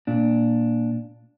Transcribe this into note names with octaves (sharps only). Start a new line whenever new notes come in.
A#2 D4